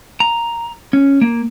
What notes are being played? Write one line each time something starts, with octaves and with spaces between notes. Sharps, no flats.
A#5
C#4
A#3